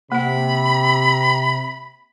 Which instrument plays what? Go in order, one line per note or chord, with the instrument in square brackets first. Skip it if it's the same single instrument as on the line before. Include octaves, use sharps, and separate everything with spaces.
[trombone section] C3 [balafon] A#3 F#5 [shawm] B5